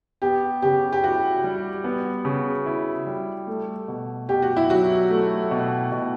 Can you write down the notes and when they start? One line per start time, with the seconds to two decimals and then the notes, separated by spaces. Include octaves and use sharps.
0.22 B3 G4
0.62 C#3 G4
0.93 G4
1.03 E4 F#4
1.44 G3
1.84 B3
2.25 C#3
2.66 E4
3.07 G3
3.47 A3
3.88 B2
4.29 B2 G4
4.42 F#4
4.57 E4
4.70 F#3 F#4
5.10 A3
5.51 B2
5.92 B2